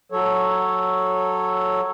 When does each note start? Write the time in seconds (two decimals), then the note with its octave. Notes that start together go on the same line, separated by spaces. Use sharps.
0.12 F#3 A4 C#5